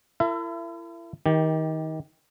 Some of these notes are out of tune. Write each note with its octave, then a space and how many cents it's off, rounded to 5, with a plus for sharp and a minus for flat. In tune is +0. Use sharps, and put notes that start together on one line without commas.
E4 +35 A#4 -40 E5 +30
D#3 +25 G4 +0